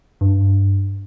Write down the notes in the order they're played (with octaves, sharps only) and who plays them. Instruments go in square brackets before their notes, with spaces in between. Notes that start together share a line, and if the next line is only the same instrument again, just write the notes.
[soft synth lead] G2